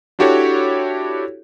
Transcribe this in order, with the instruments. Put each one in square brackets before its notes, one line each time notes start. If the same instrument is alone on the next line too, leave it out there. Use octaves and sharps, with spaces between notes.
[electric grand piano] D4 E4 F#4 G4 A4 C#5